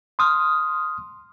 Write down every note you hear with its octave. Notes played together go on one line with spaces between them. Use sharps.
C6 D#6 F6